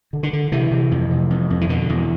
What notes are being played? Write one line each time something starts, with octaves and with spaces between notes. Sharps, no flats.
D3
D3
D3
C3 E3
C3
F2
C3
F2
F2
E3
B2 D3
E2